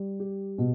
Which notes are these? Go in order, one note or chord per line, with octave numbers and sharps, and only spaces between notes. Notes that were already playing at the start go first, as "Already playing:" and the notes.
Already playing: G3
G4
B2